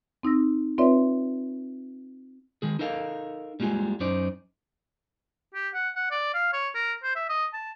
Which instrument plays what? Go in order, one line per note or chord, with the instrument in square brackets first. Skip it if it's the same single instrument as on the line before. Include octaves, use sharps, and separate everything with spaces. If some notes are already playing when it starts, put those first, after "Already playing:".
[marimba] C4 D#4 E6 A#6
C4 F4 B4 C#5 D5 E5
[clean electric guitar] D#3 G#3 G#4
D#4 A4 A#4 D#5 F5
G3 G#3 A#3 F4 G#4
F#2 C#4 D#4 C5 D5
[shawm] G4
F#5
F#5
D5
F5
C#5
A#4
C5
E5
D#5
A5